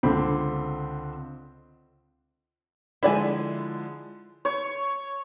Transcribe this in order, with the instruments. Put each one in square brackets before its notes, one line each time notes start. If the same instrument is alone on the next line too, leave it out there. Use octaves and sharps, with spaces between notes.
[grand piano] C#2 D3 C4 D4 B5
[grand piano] D3 F3 G#3 [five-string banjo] E4 D5 G#5
[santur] C#5